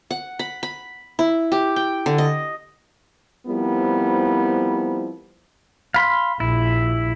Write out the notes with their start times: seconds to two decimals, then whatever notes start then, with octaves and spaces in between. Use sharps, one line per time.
0.11 F#5
0.39 B5
0.63 B5
1.19 E4
1.52 G4
1.76 G5
2.06 D3
2.18 D#5
3.47 F3 G3 B3 C4 E4 A#4
5.94 F5 B5 C6
6.40 A#1 E4